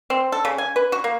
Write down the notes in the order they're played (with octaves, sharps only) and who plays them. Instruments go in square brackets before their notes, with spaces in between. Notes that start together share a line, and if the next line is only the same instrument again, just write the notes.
[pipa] C4
A4
C#3
G#5
B4
F#4
A#3